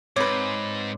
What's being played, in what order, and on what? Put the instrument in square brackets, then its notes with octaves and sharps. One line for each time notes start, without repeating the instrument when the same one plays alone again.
[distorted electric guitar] G#2 [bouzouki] C4 B4 [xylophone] C#5 [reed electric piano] D6